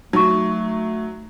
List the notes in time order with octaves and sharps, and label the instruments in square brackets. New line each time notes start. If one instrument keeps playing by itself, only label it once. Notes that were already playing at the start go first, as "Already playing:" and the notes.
[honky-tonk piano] F#3 [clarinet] A3 [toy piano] D#4 C#6